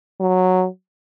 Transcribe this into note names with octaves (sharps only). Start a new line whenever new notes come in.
F#3